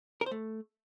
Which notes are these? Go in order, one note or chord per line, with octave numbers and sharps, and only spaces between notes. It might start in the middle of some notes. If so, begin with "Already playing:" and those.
A#4
C5
A3